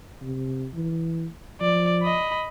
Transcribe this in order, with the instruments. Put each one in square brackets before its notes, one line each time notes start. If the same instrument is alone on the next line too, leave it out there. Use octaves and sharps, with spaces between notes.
[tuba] C3
E3
[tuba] F3 [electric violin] D5
[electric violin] D#5 B5